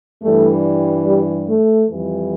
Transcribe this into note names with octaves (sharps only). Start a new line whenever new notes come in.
G2 E3 G3 A3
G3
A3
F2 E3 G3